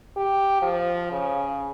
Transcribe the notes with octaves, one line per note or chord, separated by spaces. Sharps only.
G4
F3
C#3